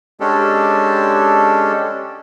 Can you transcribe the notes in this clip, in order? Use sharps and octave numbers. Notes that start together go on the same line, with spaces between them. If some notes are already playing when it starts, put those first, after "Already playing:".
G#3 C#4 D4 G4 A4